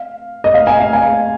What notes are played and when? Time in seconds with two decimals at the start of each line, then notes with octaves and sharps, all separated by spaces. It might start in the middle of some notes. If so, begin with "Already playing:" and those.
Already playing: F5
0.44 D#5
0.54 F5
0.67 G#5
0.80 F5
0.93 G#5